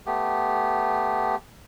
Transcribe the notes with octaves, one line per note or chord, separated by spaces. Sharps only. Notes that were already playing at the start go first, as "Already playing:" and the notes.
A3 B3 G4